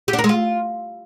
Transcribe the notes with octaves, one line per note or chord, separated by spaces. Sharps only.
G4
D4
A#4
G#3
F4